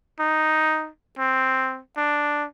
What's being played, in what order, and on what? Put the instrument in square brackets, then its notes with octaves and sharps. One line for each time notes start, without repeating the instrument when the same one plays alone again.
[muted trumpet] D#4
C4
D4